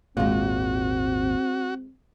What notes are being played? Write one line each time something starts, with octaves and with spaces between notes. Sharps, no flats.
G#1 D#2 A#2 G#3 C4 F4 F#4